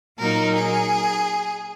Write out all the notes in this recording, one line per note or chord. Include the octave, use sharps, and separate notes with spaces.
A#2 F#3 A#3 D#4 A#4
G#4